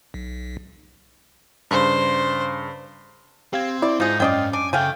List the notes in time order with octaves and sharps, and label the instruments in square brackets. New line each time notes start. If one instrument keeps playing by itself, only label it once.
[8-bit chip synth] B1
[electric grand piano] G2 C#3 [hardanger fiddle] C5
[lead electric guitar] C4 [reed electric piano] G4 F5 G#6
[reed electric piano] E4 [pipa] D5
[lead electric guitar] G#2 [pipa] F3 G#4 [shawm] D#4
[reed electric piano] F#2 C#4 [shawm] F4 [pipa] D5 D#5 G5
[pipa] D4 [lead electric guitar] G#5 [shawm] D6
[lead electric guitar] C#3 [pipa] A3 F5 G#5 [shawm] G5